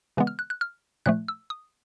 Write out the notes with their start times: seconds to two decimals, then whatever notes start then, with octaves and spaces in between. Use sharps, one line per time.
0.17 C#3 E3 G#3 B3
0.27 F6
0.39 F#6
0.50 F#6
0.61 F6
1.06 A#2 F3 A3 F#6
1.28 E6
1.50 D#6